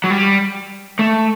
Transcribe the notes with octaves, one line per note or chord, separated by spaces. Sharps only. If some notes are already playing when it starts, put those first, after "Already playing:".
F#3
G3
A3